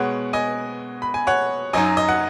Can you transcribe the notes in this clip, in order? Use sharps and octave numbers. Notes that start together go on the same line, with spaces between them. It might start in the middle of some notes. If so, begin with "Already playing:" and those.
Already playing: B2 G#3 B3 C#5 F#5
D#5 G#5
B5
G#5
C#5 F#5
F#2 F#3 D#4 D#5 G#5
D#5
F#5